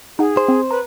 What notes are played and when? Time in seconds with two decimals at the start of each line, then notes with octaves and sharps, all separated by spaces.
0.19 D#4 G#4 F#5
0.37 C5
0.49 C4
0.71 B4 A#5